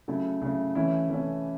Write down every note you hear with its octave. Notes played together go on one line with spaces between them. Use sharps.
C#3 F#3 A3 E4
C#3 F#3 A3 E4
E3 A3 C#4 E4
E3 A3 C#4 E4